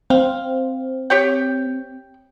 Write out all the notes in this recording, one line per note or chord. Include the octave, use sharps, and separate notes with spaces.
C4 F5
G4 C#5 G5